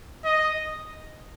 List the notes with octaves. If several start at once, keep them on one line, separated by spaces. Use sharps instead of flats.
D#5